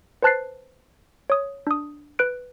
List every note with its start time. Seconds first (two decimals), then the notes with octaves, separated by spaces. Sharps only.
0.22 B4 C5 A5 F#6 A6 C7
1.30 C#5 D#6
1.67 D4 D#6
2.19 B4 F#6 D7